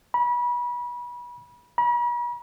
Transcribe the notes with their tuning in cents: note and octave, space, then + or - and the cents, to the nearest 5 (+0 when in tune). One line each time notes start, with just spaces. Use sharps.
B5 -30
B5 -45